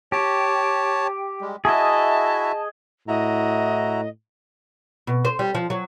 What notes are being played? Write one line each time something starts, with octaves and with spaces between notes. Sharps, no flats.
G4 C#5 A5
G3 G#3
E4 F#4 G#4 D#5 E5 A5
A2 E4 F#4 D#5 A#5
B2
C5
G3
F3
F#3